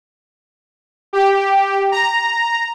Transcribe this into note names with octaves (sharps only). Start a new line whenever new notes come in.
G4
A#5